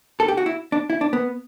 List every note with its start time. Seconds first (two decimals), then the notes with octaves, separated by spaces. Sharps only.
0.20 A4
0.28 G4
0.37 F#4
0.46 E4
0.72 D4
0.90 E4
1.01 D4
1.13 B3